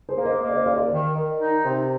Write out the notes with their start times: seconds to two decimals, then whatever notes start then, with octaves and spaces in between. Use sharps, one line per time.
0.09 G#4 C5
0.17 A#3
0.25 C5 D#5
0.41 A#3
0.49 D5
0.54 C5 D#5
0.66 D#2 D5 F5
0.78 A#4 D5
0.90 D#3
1.15 D#3
1.39 D#4
1.64 C3